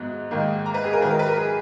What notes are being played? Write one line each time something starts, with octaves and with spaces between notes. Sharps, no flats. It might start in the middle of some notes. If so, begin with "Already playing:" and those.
Already playing: G#2 F#3 B3 F#6
G#2 D#3 A#3
A#5
B4
G#4
A#4
G#2 D#3 F#3 B4
A#4
B4
A#4
G#4